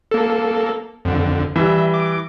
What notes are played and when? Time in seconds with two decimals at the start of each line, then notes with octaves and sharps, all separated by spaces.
0.11 A#3 A4
1.05 F2 D3
1.56 E3 G3 E5
1.94 D6